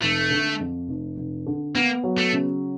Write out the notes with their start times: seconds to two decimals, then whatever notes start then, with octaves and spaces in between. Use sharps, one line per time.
0.01 F1 A3
0.31 D3
0.60 F2
0.88 F1
1.17 F1
1.46 D3
1.75 A#3 B3
2.04 F#3
2.18 A3
2.32 C#3